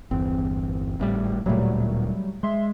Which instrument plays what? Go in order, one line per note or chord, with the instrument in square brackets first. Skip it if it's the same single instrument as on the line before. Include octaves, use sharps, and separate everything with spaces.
[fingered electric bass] G1 E2 [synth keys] C4
[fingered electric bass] G#1 A2 G3
[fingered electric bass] D1 A#2 [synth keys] F#3 G3 A3
[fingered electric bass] G#3 [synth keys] E5 C6